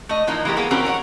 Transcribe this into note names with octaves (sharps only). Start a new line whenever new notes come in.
A3 D#5
E3 F3 A#3 D#4
E3 G#3 A3 G4 A#4
F#3 A#3 B3 G4 G#4
E3 C4 C#4 F#4 G4 A#4
A#4 C#5 D5 F#5